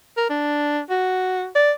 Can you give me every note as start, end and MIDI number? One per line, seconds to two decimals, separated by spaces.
0.17 0.29 70
0.30 0.80 62
0.90 1.46 66
1.55 1.72 74